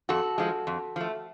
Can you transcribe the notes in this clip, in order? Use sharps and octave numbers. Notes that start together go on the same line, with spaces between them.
F2 F#4 A4
F3 G#3
F2
F3 A3